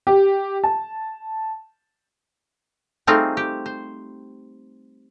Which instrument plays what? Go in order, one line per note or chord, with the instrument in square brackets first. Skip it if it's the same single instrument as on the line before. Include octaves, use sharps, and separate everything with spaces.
[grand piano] G4
A5
[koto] G3 A3 C4 D#4 F4 G#4
G4
C5